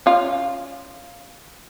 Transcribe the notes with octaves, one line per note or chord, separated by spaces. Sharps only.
C#4 F4